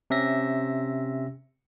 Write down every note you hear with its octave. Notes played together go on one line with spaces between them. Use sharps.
C3 C#4 E5 A#6